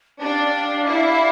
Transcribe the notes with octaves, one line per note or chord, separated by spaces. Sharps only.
D4 G4 D5 F5
E4